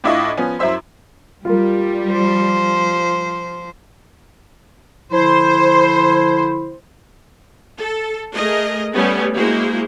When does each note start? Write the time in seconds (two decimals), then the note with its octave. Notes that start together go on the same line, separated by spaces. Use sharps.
0.04 A2 D4 E4 F4 D#5 C#6
0.37 F3 B3 C#4
0.59 F#2 E4 C5 E5 C6
1.45 G3 F4 A#4
2.12 F3 C5
5.12 D3 F3 E4 C5
7.78 A4
8.33 A3 G#4 A#4 D#5
8.94 G3 A3 B3 C#4
9.35 G#3 A#3 E4 F#4 C5